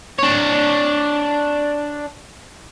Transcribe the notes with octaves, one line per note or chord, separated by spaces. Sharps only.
D4 C#5